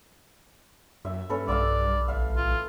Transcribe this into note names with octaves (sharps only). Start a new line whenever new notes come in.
F#2 E5
G2 C#4 A4 B4
B1 D5 F5 D6 E6
A1 E5 F5
F4